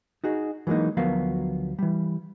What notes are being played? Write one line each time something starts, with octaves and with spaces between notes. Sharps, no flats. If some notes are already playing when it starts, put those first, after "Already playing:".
D#4 F#4 G#4
E3 F#3 G#3 A#3 D#4
D2 F3 F#3 B3 A#4 F5
E3 G3